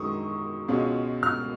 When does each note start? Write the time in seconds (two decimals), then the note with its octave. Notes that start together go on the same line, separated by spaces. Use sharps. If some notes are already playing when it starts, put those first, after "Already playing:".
Already playing: F#2 D#3 G#3 C#6 D#6
0.68 C#2 B2 G#3 C#4 F4
1.23 F6